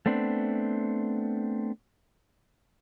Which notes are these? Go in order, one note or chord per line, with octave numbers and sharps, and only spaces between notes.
A3 B3 C4 D4